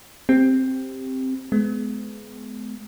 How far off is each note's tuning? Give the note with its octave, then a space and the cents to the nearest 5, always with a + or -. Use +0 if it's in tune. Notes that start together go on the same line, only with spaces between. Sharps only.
C4 +0 G4 +5
G#3 +30 B3 +25